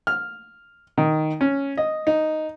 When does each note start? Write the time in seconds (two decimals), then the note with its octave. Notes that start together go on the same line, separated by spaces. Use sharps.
0.07 F6
0.98 D#3
1.41 C#4
1.77 D#5
2.07 D#4